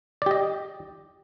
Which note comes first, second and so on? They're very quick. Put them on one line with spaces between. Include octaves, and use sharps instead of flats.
D5 G4 D#5